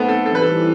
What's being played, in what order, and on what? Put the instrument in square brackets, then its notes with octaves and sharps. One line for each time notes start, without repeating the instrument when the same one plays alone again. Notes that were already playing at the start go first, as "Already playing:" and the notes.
Already playing: [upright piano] A3 B3 C4
A4
[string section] E3 G3 C4 [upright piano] A4
[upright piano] B4
A4